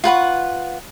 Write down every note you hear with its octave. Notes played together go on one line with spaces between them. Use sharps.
F4 B4 F#5 C#6